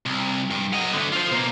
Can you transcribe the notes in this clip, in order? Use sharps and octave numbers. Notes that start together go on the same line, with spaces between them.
C2
G2
F#3 D#5
D3 A3
F4 C5
B2 A#3